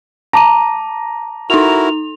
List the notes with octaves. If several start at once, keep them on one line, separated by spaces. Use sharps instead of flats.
A5 A#5 D6 D#7
D#4 E4 F#4 A#4 F7